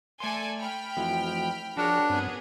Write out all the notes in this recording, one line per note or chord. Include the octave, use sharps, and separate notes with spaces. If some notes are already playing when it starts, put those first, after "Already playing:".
A3 A4 D5 G#5 C6
G5 B5 F6
F2 E3 F3 A3 E4 F#4
F3 D4 F#4 G#4 A#4 C#5
G2 B3 C4 G#4